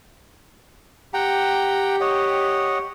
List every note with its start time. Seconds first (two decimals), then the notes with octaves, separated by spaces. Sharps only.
1.14 G4 F#5 G5 A#5
2.00 C#5 D#5 F#5